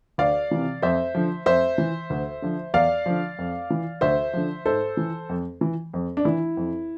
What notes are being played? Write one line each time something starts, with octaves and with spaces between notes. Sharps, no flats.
D2 D5 F5
C3 E3
F2 C5 E5
D3 F3
F2 C5 E5
E3
D2
D3 F3
E2 D5 F5
D3 F3
F2
E3
D2 C5 E5
D3 F3
G#2 A4 C5
E3
F2
E3
F2
D4
E3 E4
F2